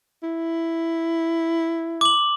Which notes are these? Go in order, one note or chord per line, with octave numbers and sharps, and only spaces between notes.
E4
D6 F#7